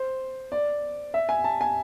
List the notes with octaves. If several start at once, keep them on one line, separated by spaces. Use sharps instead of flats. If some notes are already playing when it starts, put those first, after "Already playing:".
Already playing: C5
D5
E5
G#5
A5
G#5